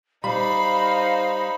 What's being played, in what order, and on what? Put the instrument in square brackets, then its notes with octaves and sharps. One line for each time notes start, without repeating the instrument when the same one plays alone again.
[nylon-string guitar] G3 [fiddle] D#4 C5 [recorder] F5 [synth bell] B5